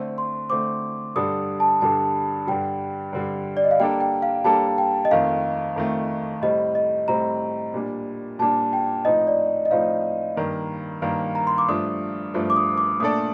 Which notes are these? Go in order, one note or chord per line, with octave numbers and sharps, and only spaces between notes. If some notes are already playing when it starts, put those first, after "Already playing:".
Already playing: D3 A3 C4
C6
D3 A3 C4 D6
G2 D3 G3 D4 A4 D#6
A5
G2 D3 G3 D4 A4 A5
G2 D3 G3 G5
G2 D3 G3
D5
D#5
F5
G3 A#3 D4 A4 G5
G5
F5
G3 A#3 D4 A4 A5
G5
D#5
F2 D#3 A3 F5
F2 D#3 A3
A2 G3 C4 D#5
D#5
A2 G3 C4 A#5
A#2 G3 D4
A#2 G3 D4 A5
G5
A2 F3 C4 D#4 D#5
D5
D#5
A2 F3 C4 D#4 F5
G2 D#3 A#3
G2 D#3 A#3 F5
A#5
C6
D6
G2 F3 A3 D4 D#6
G2 F3 A3 D4
D6
D#6
D6
A#2 A3 D4 A4 D5 D#6